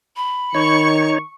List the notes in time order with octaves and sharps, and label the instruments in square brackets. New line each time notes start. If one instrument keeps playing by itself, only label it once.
[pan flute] B5
[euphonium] D#3 [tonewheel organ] D#4 C#5 [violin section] C#6 C#7